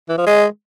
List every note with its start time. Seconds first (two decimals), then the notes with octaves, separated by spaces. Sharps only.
0.09 E3
0.18 F3
0.27 G#3